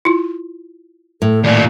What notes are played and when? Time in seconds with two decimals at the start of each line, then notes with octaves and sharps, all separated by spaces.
0.05 E4 F4
1.22 A2 A4
1.44 D#2 A#2 D5